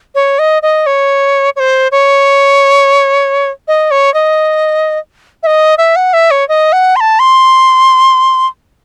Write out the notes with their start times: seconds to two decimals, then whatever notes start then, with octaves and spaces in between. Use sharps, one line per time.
0.15 C#5
0.39 D#5
0.62 D#5
0.86 C#5
1.56 C#5
1.60 C5
1.92 C#5
3.68 D#5
3.91 C#5
4.14 D#5
5.43 E5
5.47 D#5
5.78 E5
5.96 F#5
6.13 E5
6.31 C#5
6.49 D#5
6.73 F#5
6.96 C6
7.00 A5
7.19 C6